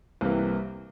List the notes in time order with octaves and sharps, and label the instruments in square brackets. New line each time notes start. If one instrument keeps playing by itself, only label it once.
[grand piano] C2 C3 E3 A#3